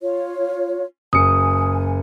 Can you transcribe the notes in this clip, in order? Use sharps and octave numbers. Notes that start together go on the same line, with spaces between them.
F4 C#5
F#1 G#5 D#6 C#7